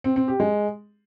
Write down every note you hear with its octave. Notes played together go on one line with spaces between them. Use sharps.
C4
C4
G4
G#3